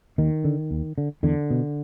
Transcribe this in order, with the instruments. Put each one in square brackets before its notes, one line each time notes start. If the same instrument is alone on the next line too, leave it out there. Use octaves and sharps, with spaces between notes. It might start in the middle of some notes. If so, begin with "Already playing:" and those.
[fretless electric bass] D#2 D#3
D3
D#2
D3
E2 D3
B2